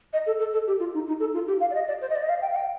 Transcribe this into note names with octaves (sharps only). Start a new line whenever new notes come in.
D#5
A4
A4
A4
G4
F4
D#4
D#4
A4
F4
G4
F5
D5
D#5
D5
C5
D#5
D5
D#5
F5
G5
F5
G5